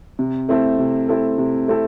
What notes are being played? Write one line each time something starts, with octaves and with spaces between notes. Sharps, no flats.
C3
A3 C4 E4 A4
C3
A3 C4 E4 A4
C3
A3 C4 E4 A4